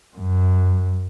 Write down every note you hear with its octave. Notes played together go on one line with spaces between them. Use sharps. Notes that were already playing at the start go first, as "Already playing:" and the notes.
F#2